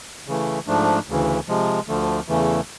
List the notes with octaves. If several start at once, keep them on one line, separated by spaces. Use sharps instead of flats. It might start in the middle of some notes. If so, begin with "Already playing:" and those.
C#3 E3 A3
G#2 F3 A3 D4
D2 C#3 E3
C3 F3 G#3
D2 D3 F3 A3
E2 C#3 E3 A3